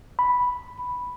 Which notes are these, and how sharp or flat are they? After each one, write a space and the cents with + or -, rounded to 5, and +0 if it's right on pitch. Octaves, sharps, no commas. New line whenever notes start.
B5 +0